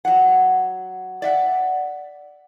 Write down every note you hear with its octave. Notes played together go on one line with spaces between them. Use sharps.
F#3 F#5
D5 E5 F#5